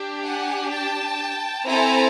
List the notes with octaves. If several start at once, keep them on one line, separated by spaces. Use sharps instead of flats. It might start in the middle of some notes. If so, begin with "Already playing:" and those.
Already playing: D4 G4
F#5 G#5
G5 A5
C4 E4 A4 G#5 A#5